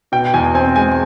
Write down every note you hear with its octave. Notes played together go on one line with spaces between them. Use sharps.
B2 G5
E2 G#5
C4 G#5
G#3 G#5